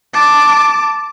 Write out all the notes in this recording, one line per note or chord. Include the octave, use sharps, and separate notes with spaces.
A5 D6